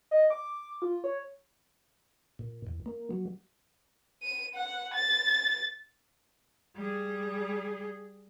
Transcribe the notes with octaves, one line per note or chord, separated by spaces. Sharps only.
D#5
D6
F4
C#5
A#2
E2
A#3
F#3
D#7
F#5
A6
G3 G#4